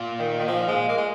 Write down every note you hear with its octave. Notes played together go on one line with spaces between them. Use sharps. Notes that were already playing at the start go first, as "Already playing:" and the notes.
Already playing: A#2
D#3
D#3
F3
G#3
A#3
G#3